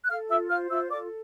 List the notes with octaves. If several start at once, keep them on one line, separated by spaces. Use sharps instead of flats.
F#6
A4 F5 F6
F4 E5 E6
C5 F5 F6
F4 E5 E6
A4 D5 D6